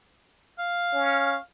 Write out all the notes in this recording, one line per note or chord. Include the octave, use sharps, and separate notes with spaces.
F5
C#4